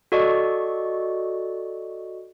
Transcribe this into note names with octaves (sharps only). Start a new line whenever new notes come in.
F#4 A4 D5 D#5 C#6